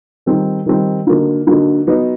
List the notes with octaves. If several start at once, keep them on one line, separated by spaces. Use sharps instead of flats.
D#3 G3 C4 D#4
D#3 G3 C4 D#4
D3 F#3 A#3 D#4
D3 F#3 A#3 D#4
F#3 B3 D#4